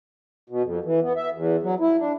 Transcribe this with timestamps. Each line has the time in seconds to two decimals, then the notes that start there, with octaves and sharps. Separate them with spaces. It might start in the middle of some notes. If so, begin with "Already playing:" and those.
0.50 B2
0.63 F2
0.85 E3
1.02 B3
1.16 E5
1.33 E2
1.63 F#3
1.80 E4
1.99 D4